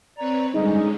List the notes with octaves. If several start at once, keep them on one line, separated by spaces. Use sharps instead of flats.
C4 B4 C#5 D5 A#5
D3 G3 G#3 C#4 D#4 G#4